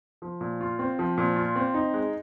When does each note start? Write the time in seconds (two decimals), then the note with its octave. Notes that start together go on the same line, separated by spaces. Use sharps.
0.22 F3
0.41 A#2
0.61 F4
0.79 C4
0.99 F3
1.18 A#2
1.36 F4
1.56 C4
1.74 D#4
1.94 G#3